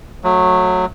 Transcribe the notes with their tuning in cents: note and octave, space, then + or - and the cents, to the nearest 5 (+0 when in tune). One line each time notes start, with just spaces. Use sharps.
F#3 -15 A3 +0